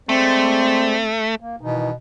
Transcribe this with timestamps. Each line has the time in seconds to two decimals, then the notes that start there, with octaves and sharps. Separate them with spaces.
0.09 G#3 A3 C4 C5 D5
1.41 A#3
1.61 B2 D#3 E3 D#4